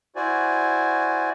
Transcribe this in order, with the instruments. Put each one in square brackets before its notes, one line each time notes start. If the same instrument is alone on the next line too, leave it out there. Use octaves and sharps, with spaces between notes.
[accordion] E4 F#4 C5 D5 G#5